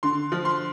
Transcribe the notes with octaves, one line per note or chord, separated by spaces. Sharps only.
D3 C6
F3
C6